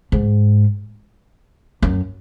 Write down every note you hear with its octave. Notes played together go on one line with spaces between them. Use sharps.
G#2
F#2